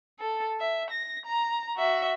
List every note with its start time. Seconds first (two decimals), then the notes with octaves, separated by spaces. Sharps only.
0.20 A4
0.60 E5
0.91 A#6
1.26 A#5
1.76 F#4 E5